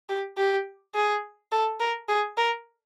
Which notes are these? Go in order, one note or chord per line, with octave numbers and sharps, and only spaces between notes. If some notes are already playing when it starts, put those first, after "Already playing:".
G4
G4
G#4
A4
A#4
G#4
A#4